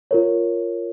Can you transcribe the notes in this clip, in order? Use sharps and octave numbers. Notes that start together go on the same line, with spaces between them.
F4 A#4 C#5